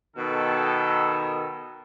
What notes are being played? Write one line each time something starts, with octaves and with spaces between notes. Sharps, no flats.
B2 D#3 A4